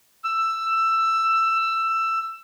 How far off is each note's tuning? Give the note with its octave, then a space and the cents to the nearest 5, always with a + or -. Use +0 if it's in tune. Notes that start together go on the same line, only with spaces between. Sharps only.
E6 +15